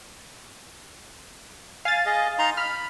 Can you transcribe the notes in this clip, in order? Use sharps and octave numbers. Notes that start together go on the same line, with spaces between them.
F5 G#5 A6
G#4 D#5
D#4 A#5 C6
B5 F6